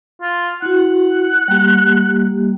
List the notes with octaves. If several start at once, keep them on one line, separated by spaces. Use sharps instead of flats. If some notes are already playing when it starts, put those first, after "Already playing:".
F4
E4 F#4 F#5
G3 A#3 G4